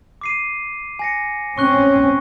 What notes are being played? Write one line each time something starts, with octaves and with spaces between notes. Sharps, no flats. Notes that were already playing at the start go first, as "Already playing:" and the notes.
D6 C7 D#7
G#5 A#6 C#7
C4 C#4 C#6 F#6 G7